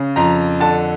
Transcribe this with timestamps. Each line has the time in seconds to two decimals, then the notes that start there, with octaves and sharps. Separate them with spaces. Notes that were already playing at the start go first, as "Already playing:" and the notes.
Already playing: C#3
0.16 F2 A#5
0.60 D3 A5